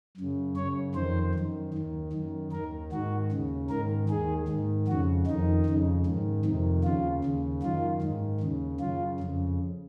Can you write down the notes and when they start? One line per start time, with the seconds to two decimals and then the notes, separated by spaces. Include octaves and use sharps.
0.17 F#2 C#3
0.56 F#2 C#3 C#5
0.95 F2 D#3 C5
1.35 F#2 D#3
1.74 D#2 D#3
2.13 F#2 D#3
2.52 D#2 D#3 A#4
2.92 G#2 D#3 F#4
3.32 D#2 C#3
3.70 G#2 D#3 A#4
4.09 D#2 D#3 G#4
4.48 G#2 D#3
4.88 F2 C#3 F#4
5.27 F2 D#3 D#4
5.66 F2 C#3
6.06 G#2 D#3
6.45 F2 C3 D#3
6.84 D#2 C#3 F4
7.24 D#2 C#3
7.63 F#2 D#3 F4
8.02 G#2 D#3
8.41 D#2 C#3
8.80 F#2 C#3 F4
9.20 F2 C#3